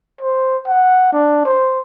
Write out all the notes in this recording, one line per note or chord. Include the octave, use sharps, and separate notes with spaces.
C5
F#5
D4
C5